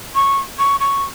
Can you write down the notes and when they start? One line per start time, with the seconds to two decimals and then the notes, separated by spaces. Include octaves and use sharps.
0.15 C#6
0.59 C#6
0.80 C#6